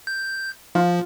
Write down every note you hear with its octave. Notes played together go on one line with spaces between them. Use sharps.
G6
F3 F4